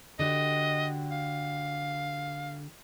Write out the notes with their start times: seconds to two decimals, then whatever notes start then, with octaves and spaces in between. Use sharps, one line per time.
0.19 D3 F#4 G4 D#5
1.11 F5